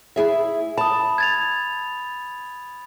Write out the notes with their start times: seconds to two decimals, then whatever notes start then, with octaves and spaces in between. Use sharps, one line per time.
0.16 E4 G#4 E5
0.78 A5 B5 D#6
1.18 G#6 A6 F7